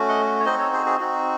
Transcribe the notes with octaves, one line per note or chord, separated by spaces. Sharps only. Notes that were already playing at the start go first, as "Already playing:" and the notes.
Already playing: A3 C#4 F#4
D#5 F#5
C#5
C4 D#4 F#4 C5 D#5
A4 C#5
G#4 C5
G#4
C4 D#4 F#4